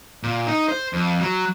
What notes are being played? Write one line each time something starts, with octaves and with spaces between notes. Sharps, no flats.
A#2
D#4
C5
F2
F#3